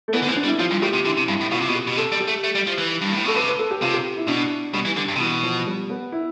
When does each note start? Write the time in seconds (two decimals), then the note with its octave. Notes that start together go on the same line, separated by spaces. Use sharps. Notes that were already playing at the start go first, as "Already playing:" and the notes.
0.08 A3
0.13 E3 B3
0.22 D3
0.25 E3 C4
0.36 D4
0.44 G3
0.48 E4
0.59 F3 F4
0.71 G2
0.82 A2 G4
0.94 C3
1.05 D3 E4
1.17 C3
1.28 G2
1.41 A2
1.51 B2 F4
1.60 C3
1.68 B2
1.75 G4
1.87 B2
1.97 C3 A4
2.13 G3
2.20 G4
2.28 A3
2.44 A3
2.55 G3
2.67 F3
2.78 E3
3.02 G2
3.13 A2
3.25 B2 A4
3.36 C3 B4
3.48 B4
3.59 A4
3.71 G4
3.82 C3 F4
3.93 G4
4.17 E4
4.28 B2 D4
4.74 B2 G3
4.85 E3
4.97 D3
5.08 G2
5.16 C3
5.20 B2 E3
5.43 F3
5.67 G3
5.90 B3
6.12 E4